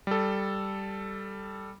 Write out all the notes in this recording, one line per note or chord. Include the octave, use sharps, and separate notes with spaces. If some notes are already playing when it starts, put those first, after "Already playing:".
G3 A4